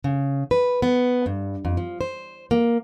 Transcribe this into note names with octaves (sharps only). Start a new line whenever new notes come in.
C#3
B4
B3
G2
F2
F3
C5
A#3